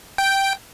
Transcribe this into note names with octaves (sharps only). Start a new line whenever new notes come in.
G5